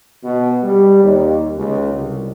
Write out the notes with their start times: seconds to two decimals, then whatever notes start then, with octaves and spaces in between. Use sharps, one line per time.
0.24 B2
0.64 G3
1.03 D#2
1.57 C#2
1.93 C2